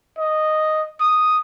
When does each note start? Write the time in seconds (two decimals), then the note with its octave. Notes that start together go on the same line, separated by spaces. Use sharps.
0.19 D#5
1.00 D#6